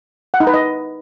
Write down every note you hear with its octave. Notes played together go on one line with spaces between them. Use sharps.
F#5
D#4
B4
D#5